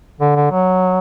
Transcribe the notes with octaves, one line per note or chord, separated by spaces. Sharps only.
D3
D3
F#3